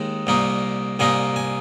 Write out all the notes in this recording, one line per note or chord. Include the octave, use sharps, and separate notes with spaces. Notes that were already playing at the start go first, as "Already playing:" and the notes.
Already playing: D#2 D#3 G#3 D#4
C2 A#2 A#3 D#4
C2 A#2 A#3 D#4 G#5
G#5